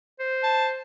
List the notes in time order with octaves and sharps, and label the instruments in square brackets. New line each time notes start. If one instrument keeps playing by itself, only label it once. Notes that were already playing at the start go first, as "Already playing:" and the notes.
[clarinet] C5
[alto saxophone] A5